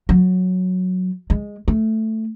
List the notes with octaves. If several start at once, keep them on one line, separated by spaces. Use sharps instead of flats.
F#3
G#3
A3